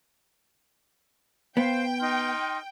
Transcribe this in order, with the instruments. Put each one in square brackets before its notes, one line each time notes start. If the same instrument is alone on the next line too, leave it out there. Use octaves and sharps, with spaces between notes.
[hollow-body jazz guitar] B3 [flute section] C5 F5 [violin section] G5
[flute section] D#4 C6 F6